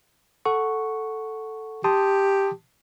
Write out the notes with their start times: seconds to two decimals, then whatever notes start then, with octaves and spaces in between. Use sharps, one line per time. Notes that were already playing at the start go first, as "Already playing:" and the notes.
0.45 A4 F#5 C#6
1.84 G4 A5 C6 D#6